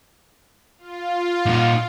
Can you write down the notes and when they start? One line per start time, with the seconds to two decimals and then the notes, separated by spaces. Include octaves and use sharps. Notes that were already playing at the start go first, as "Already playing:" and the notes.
0.78 F4
1.46 A#2 D#4